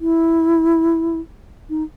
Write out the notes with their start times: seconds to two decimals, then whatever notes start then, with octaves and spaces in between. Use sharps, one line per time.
0.01 E4
1.70 D#4